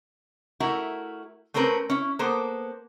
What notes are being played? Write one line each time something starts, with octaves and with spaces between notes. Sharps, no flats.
A3 E4 F#4 A#4
A3 C4 C#4 A#4 B4
C#4 E4
A#3 B3 A4 C5